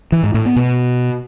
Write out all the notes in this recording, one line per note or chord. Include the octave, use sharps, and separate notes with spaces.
E3
G#2
A2
B3
B2